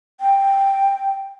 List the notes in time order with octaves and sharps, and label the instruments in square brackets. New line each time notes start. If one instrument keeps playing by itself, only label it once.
[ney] G5